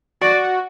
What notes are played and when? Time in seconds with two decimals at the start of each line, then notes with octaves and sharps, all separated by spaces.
0.21 F#4 D5